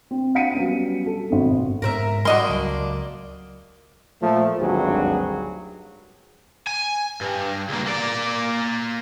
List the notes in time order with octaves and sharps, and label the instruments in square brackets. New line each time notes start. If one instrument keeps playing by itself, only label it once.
[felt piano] C4
F5 F#5 B6 C#7 D#7
F#3 G3 B3 C#4
A4
G#1 B2
[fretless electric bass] G#2 [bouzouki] A#4 B4 E5
[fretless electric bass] G3 [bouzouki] A#3 D4 [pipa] F#4 D#5 C6
[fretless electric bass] C#2 F#3
[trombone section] A#2 F3 A3
G#1 D2 G2 F#3 G#4
[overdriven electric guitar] G#5
G2
C#2 A#3
A#3 D5